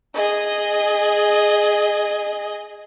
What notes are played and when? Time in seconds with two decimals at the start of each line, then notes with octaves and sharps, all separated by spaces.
0.15 G#4 D#5